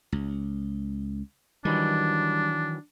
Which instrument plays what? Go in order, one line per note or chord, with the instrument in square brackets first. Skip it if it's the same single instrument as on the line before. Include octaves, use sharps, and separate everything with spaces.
[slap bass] C#2
[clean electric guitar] D#3 E3 F#3 [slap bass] G3 [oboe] D4